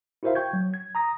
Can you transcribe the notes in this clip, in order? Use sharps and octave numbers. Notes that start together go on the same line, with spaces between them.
E4 F#4 A#4 C5 E5 F5
G5 C#6 G6 G#6
F#3
G#6
A#5 D#6 A#6